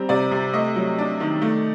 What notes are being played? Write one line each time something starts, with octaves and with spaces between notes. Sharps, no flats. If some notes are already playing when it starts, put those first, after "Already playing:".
Already playing: G3 C4 A#5
C3 D5
C3
A3 D#5
F#3
D4
D#3
A3